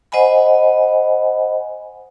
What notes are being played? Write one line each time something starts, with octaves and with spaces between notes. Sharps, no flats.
C5 D#5 F#5 G#5 B5